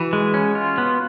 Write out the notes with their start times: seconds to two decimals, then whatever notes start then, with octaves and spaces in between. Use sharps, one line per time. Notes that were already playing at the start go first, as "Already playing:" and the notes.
Already playing: E3 F#4
0.13 G#3
0.34 C#4
0.55 F4
0.78 B3